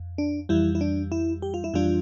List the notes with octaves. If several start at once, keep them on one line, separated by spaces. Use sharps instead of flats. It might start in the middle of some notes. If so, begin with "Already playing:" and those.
Already playing: F2
D4
F2 E3 G3 E4
E4
D4
E4
G4
F4
E4
F2 E3 G3 D4 F4